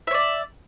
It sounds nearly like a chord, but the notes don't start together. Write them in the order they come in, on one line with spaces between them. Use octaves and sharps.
E5 C#5 D5